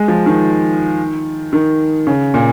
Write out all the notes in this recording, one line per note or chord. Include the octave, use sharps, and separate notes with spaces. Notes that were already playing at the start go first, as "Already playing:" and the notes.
Already playing: G#3
F3
D#3
D#3
C#3
A#2